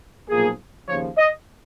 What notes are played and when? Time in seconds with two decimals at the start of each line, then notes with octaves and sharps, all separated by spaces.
0.29 B1 A#2 F3 A#3 G#4
0.88 D#2 C#3 F3 C#5
1.17 D#5